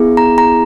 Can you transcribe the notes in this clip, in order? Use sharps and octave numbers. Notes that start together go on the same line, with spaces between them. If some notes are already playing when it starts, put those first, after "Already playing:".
Already playing: B3 E4 G#4
A#5
A#5